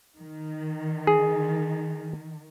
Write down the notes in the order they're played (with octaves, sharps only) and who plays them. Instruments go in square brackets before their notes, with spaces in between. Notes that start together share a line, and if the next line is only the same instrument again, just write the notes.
[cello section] D#3
[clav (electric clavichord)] G#4